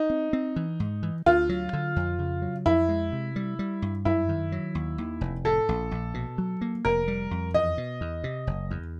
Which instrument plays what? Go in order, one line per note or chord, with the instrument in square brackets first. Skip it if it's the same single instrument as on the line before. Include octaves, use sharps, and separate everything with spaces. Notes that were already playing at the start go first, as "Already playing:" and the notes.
Already playing: [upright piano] D#4
[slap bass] C4
C4
E3
G#2
E3
[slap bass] D2 [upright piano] F4
[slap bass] F#3
D3
F2
C#3
F#3
[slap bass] F2 [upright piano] E4
[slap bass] G#3
C3
G3
G3
G2
[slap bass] F#2 [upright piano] E4
[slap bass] D#3
F#3
D#2
D#2
F1
[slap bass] A2 [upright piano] A4
[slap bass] A#1
A#1
B2
F#3
A#3
[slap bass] F1 [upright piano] A#4
[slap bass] G3
F2
[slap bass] E2 [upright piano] D#5
[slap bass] B2
E2
C3
F#1
E2